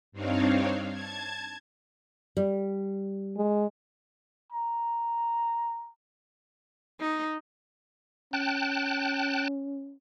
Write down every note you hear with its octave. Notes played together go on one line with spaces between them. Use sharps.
G2 C4 D4 D#4 C#5 F5
A5 G#6
G3
G#3
A#5
D#4
C#4 G5 A5 F#6